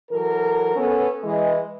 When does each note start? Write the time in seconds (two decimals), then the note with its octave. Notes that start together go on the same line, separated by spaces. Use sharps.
0.10 E3 F#3 A4 A#4
0.76 B3 C#4 A4
1.24 E3 G#3